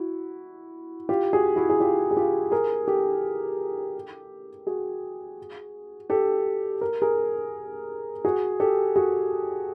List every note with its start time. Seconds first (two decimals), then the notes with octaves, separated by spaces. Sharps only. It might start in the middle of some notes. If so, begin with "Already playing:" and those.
Already playing: E4 F#4
1.09 F4 G4
1.33 F#4 G#4
1.56 E4 F#4
1.70 G#4
1.80 F4 G4
2.11 G#4
2.17 F4 G4
2.52 G#4 A#4
2.88 G4 A4
4.67 F#4 G#4
6.10 G4 A4
6.81 A#4
7.02 G#4 A#4
8.25 F#4 G#4
8.60 G4 A4
8.96 F#4 G#4